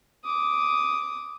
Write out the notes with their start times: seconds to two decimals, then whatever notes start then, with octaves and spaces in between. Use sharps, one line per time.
0.25 D6 D#6